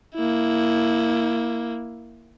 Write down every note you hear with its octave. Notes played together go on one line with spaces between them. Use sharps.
A#3 E4